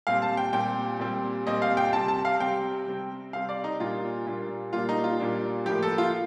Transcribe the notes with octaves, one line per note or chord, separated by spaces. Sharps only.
A#2 G3 C4 F5
A5
G5
A#2 G3 C4 G5
A#2 G3 C4
A#2 G3 C4 D#5
F5
G5
C3 G3 C4 A5
A5
F5
C3 G3 C4 G5
C3 G3 C4
C3 G3 C4 F5
D5
D#4
A#2 G3 A#3 D4 F4
A#2 G3 A#3 D4
A#2 G3 A#3 D4 F4
D#4
F4
A#2 G3 A#3 D4
A2 F3 A#3 G4
A4
F4